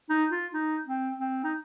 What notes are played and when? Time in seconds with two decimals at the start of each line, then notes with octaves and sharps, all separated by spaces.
0.10 D#4
0.31 F4
0.54 D#4
0.86 C4
1.19 C4
1.44 D#4